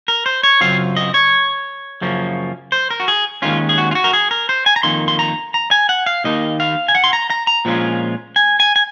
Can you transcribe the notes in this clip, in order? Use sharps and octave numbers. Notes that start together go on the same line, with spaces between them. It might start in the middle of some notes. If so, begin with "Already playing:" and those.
A#4
C5
C#5
F#2 C#3 F#3 C4 F4 F5
D#5
C#5
F#2 C#3 F3 A#3 C#4
C5
A#4
F#4
G#4
D#2 D#3 G#3 C#4 F4
G#4
F#4
F4
F#4
A#4
G#4
A#4
C5
G#5
A#5
F2 D#3 A#3 C6
C6
A#5
A#5
G#5
F#5
F5
D#2 D#3 A#3 D#4 D#5
F5
G#5
F#5
C6
A#5
A#5
A#5
A#2 F3 G#3 C#4 F4
G#5
G#5
G#5